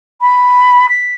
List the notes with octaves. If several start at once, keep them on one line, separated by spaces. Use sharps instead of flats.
B5
B6